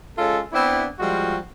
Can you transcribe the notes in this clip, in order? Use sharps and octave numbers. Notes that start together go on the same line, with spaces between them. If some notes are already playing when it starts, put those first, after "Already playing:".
G#3 C#4 F4 A4
B3 C4 D4 E4
F3 G3 G#3 F4 F#4